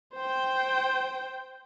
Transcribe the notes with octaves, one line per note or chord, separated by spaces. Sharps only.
C5 G5